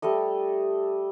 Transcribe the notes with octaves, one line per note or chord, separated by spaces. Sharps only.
G3 A3 A4 D#5